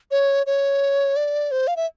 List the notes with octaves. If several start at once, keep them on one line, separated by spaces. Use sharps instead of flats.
C#5
C#5
D5
C5
F5
E5